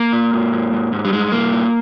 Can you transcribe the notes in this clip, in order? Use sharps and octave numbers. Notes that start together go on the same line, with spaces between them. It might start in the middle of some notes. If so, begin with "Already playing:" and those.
Already playing: A#3
A#2
G#2
G#2
G#2
G#2
G3
G2 G#3
G2 A#3
A#2